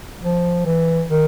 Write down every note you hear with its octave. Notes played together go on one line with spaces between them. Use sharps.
F3
E3
D#3